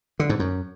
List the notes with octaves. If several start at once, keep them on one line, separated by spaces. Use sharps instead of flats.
D3
G#2
F#2